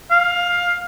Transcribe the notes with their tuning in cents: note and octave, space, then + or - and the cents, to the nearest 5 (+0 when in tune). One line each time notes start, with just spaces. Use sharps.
F5 +15